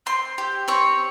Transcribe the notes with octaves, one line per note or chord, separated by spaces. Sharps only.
C4 C6
G4
C4 C#5